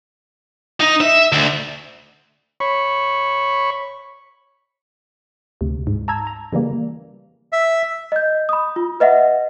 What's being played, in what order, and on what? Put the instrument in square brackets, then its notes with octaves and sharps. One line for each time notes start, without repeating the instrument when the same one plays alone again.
[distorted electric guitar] D#4
E5
D2
[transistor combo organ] C#5 B5 C#6
[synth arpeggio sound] D2 C3
G#2
A5 A#5 E6 G#6
A#5
C#3 E3 G3 A#3
[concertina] E5
[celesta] D#5 G6
B5 D#6
F4
B4 D#5 E5 F#5